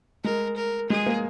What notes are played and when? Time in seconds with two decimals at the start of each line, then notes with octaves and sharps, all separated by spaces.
0.24 G#3 A#4
0.56 A#4
0.90 G#3 G#4
1.06 A#3